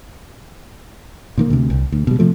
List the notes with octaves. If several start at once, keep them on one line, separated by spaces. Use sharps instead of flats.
A#2 D#3 A#3
D2 C3
C2
D2
B2 G3
C3 F3 A3